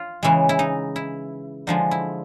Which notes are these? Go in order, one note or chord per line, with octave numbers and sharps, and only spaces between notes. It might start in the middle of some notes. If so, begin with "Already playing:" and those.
Already playing: F4
C#3 E3 G#3
E4
D#4
E4
D3 F3 G#3 D#4
E4